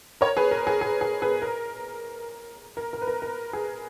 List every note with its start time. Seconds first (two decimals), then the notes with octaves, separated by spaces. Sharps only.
0.21 A#4 C#5
0.37 G#4 B4
0.51 A#4
0.67 G#4
0.81 G#4
1.01 G#4
1.22 G#4 B4
1.42 A#4
2.77 A#4
2.93 A#4
3.02 B4
3.07 A#4
3.22 A#4
3.53 G#4